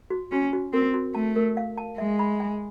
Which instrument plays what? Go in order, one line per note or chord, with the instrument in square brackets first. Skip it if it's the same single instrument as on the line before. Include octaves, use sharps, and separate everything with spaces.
[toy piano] F#4
[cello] C#4 [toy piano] F#4
[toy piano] F#4
[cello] C4 [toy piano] A#4
[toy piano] F#4
[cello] A3 [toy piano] A5
[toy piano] A#4
F5
A5
[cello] G#3 [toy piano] E5
[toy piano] B5
G#5